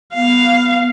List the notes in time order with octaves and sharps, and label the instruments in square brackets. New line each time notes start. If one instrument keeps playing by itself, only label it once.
[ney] B3 [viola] F5